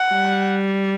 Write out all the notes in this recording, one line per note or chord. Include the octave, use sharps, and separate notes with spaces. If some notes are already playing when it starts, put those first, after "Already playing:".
Already playing: F#5
G3